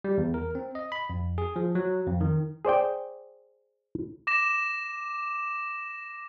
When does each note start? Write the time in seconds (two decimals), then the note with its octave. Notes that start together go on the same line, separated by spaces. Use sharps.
0.04 G3
0.18 E2
0.34 A#4
0.55 C4
0.75 D#5
0.92 B5
1.10 F2
1.38 G#4
1.56 F3
1.75 F#3
2.07 F2
2.21 D#3
2.65 G#4 C5 D5 G5
4.27 D6 A#6 E7